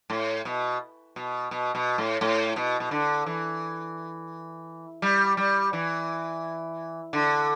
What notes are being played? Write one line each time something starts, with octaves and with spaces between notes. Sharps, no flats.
A2
B2
B2
B2
B2
A2
A2
B2
B2
D3
E3
G3
G3
E3
D3